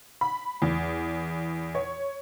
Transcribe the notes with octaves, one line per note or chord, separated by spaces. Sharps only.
B5
E2
C#5